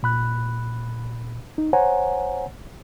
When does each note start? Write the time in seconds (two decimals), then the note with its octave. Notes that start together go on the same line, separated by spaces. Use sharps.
0.03 A#2 B5 F#6
1.58 D#4
1.73 C5 C#5 F#5 G#5 A#5